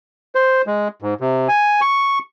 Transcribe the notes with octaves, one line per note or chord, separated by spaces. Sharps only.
C5
G#3
G#2
C3
G#5
C#6